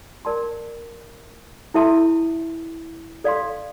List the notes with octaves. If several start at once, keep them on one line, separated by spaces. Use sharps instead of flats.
A#4 D5 A5 C6
E4 A4 E5 A5 C6
A4 D5 F5 C6